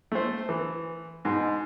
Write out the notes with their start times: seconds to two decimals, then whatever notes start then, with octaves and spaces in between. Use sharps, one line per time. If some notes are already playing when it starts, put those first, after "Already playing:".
0.12 A3 C5
0.49 E3
1.25 G#2 B2